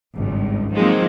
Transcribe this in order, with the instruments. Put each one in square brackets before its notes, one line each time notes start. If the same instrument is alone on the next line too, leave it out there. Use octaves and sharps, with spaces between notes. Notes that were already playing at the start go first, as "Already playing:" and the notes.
[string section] G#1 C#2 G2
D#3 F3 F#3 G#3 A#3 C4